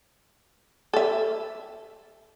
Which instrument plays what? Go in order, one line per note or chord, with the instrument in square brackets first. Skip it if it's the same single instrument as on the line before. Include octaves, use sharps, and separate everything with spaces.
[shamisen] A4 E5